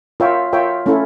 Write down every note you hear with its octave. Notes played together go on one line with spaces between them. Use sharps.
F4 A#4 C#5 E5 G5
F4 A#4 C#5 E5 G5
A3 C#4 E4 A4